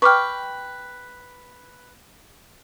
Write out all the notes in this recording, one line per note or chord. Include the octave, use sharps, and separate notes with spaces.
B4 G5 C#6 D6 F6